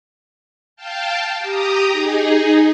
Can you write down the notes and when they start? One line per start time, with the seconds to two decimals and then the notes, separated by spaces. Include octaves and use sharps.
0.76 F5 G5 A5
1.39 G4 A#5 D#6
1.91 D#4 G#4